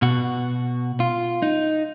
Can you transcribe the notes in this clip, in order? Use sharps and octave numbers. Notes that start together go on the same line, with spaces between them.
B2 F#4
F4
D#4